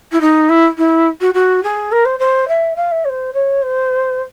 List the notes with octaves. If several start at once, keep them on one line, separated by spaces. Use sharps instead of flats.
E4
D#4
E4
E4
F#4
F#4
G#4
A#4
C5
C5
E5
F5
E5
C#5
C5
C#5
C5